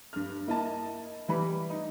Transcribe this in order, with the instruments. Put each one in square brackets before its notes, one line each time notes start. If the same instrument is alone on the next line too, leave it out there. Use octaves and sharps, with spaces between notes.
[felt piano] G2 F6
A#3 E4 D#5 A5
E3 G3 B5
D#4